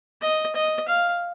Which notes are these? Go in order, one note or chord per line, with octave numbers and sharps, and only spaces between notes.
D#5
D#5
F5